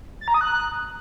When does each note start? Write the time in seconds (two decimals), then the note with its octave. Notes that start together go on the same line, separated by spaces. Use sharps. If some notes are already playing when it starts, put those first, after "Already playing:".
0.21 A6
0.28 A#5
0.34 D#6
0.41 F#6